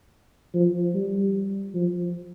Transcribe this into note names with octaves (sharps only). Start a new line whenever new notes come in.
F3
G3
F3